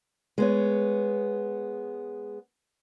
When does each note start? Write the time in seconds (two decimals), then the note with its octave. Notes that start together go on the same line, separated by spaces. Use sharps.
0.38 G#3 B3 C#5